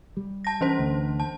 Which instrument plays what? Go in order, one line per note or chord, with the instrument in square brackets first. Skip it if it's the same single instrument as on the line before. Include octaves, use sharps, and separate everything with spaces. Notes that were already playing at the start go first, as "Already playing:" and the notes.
[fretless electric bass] G3
[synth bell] A5 A#6
E3 C#4 C5
[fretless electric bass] D2
[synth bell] A5